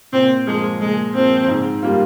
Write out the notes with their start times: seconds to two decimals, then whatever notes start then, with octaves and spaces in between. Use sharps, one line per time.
0.13 A#2 C4
0.47 F3 G#3 A#3
0.81 A#2 G#3
1.14 F3 A#3 C4
1.48 G#2
1.82 G3 A#3 F4